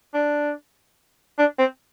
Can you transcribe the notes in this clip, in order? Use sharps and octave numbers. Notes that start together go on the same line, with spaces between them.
D4
D4
C4